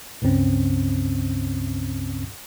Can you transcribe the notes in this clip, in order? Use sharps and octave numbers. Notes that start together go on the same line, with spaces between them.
C#2 G2 C#3 C4 C#4